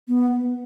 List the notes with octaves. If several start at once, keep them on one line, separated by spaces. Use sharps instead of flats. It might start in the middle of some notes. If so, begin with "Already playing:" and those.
B3